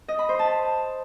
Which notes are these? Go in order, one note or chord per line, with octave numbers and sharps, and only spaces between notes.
D#5
B5
C5
A5